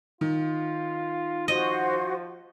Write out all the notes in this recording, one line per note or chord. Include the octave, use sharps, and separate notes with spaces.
D#3 F4
F3 F#4 C5 D#5